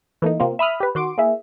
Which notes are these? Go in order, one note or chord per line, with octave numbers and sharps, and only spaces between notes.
E3 A3 A#3 D#4
C3 A#3 C4 F4
E5 B5 D#6 F6
G4 B4
D#3 F#4 C6 D6 D7
A#3 E4 G#4 E5